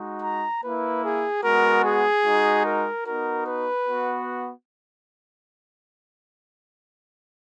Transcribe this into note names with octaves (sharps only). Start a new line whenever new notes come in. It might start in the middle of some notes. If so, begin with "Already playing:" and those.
Already playing: G#3 D#4 F#4
A#5
A#3 E4 B4
G#4
G#3 B3 F#4 A#4
G#4
G#3 D#4 F#4
A#4
B3 D#4 F#4 A#4
B4
B3 F#4